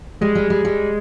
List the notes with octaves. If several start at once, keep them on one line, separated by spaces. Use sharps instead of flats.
G3 G#3
G3
G3
G3